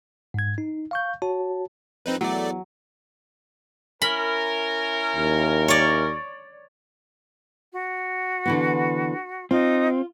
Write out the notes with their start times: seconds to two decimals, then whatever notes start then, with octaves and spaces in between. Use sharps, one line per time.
0.34 G#2 G#6
0.58 D#4
0.91 F5 C#6 G6
1.22 F#4 C#5 A5
2.06 F2 C4 D#4 B4
2.21 E2 F#3 A3 D5
4.02 C#4 E4 A#4 B5
5.16 D#2
5.68 C#5 D5
7.73 F#4
8.45 D3 E3 B3
9.51 C4 D#4 F4